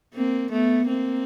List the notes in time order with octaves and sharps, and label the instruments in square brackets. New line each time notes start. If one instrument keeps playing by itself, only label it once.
[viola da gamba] A#3 C4
A3 B3
A#3 C4